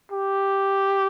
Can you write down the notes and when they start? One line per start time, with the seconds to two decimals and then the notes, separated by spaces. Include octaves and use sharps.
0.12 G4